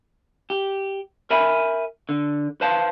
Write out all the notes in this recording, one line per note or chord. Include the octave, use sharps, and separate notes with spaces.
G4
A#4 E5 G#5 B5
D3
B4 C5 F5 A5